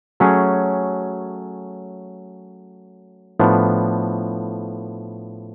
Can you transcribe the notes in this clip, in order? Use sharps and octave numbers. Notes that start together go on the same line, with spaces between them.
F#3 A3 C#4 G#4
A2 F3 B3 D4